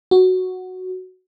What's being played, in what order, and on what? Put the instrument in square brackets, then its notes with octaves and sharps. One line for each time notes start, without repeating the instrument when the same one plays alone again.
[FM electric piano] F#4